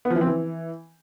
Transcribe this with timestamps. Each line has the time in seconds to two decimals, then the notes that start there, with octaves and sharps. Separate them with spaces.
0.05 B3
0.10 F3
0.16 E3
0.21 C4
0.26 E3